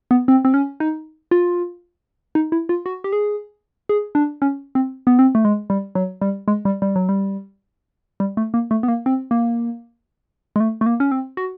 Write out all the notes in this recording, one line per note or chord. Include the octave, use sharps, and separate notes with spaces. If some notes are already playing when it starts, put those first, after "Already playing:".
B3
C4
C4
C#4
D#4
F4
D#4
E4
F4
F#4
G4
G#4
G#4
D4
C#4
C4
B3
C4
A3
G#3
G3
F#3
G3
G#3
G3
G3
F#3
G3
G3
A3
A#3
A3
B3
A#3
C4
A#3
G#3
A3
A3
A#3
C#4
C4
F#4